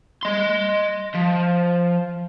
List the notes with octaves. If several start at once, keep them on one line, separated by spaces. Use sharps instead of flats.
D#5 C6
F3